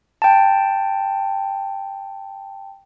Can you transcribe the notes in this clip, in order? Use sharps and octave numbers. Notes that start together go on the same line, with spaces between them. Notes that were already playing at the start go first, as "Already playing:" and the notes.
G5 A5